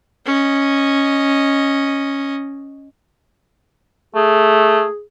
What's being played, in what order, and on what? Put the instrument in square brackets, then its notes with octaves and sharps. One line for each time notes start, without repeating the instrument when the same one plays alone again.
[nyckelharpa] C#4 D#5
[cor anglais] A3 [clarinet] G#4